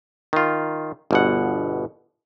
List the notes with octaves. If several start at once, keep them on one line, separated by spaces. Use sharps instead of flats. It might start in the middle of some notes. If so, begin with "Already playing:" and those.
D#3 F4
G1 B2 F#5